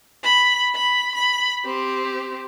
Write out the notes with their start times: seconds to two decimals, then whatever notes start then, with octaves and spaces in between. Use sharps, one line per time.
0.24 B5
0.75 B5
1.15 B5
1.65 C4 G4